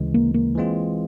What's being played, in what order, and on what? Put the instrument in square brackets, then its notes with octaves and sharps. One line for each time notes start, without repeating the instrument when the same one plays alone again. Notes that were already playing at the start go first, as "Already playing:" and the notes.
Already playing: [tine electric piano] D2 C#3 E3 G#3
[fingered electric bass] A#3
A#3
[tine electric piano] E3 G#3 C4 F4